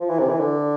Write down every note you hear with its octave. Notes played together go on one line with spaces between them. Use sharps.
F3
E3
C3
E3
D3